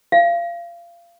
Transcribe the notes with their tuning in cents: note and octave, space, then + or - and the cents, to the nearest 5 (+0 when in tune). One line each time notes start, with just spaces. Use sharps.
F5 -25